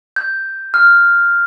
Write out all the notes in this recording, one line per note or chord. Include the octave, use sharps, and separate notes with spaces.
G6
F6